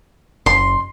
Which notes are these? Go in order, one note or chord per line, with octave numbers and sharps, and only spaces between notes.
F#1 C6